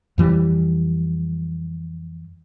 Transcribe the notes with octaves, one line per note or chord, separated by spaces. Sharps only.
F2 E3 G3